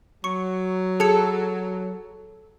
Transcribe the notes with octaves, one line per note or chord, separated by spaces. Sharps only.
F#3 C#6 C#7
G#4 A4 G#6 C#7